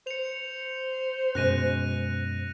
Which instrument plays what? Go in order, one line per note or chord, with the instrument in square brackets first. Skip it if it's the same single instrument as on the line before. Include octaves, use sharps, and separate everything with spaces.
[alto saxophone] C5 [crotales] C#7 F7
[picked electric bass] F#2 B2 G#3 [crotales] F#6 A#6 D#7